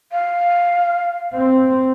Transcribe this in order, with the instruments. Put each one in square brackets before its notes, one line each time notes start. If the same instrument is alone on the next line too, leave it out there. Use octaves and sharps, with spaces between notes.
[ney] F5
[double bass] C4